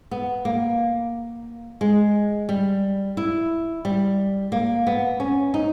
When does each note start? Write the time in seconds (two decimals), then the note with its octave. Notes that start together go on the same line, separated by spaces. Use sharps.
0.11 B3
0.45 A#3
1.81 G#3
2.49 G3
3.17 E4
3.85 G3
4.52 A#3
4.87 B3
5.20 C#4
5.54 D#4